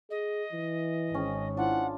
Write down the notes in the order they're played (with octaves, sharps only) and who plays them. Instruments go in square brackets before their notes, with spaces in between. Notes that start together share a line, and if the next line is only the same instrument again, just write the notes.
[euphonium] G#4 [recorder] D#5
[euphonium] E3
[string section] G#1 [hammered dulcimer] C#4 G#4
[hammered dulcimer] D4 F4 [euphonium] E4 [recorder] F#5